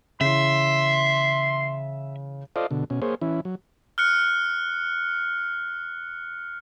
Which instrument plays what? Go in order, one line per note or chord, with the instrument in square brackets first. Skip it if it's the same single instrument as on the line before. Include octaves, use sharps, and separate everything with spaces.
[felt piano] C#3 E3 [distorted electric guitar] E5 [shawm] C6
[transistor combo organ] F4 A4 C5 D5 D#5 F5
B2 D3
B2 C#4
A#3 G#4 C5 C#5
E3 C#4 E4
F#3
[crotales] F6 F#6 C#7